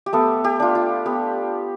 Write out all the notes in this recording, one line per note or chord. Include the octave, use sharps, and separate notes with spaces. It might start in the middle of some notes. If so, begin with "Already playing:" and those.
G4
A3 B3 A4
G4
D4 F4
F4
B3 G4